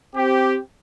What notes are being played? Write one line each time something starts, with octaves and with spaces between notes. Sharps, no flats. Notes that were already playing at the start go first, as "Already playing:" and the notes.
C4 G4